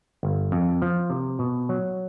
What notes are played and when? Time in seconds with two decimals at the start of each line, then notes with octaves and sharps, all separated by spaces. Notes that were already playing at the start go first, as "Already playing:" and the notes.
0.23 G1
0.52 F2
0.82 F3
1.10 C3
1.39 B2
1.69 F#3